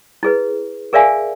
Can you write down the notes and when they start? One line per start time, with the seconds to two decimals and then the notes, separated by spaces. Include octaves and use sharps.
0.23 E4 G#4 B4
0.93 G#4 A#4 D5 E5 F5 G#5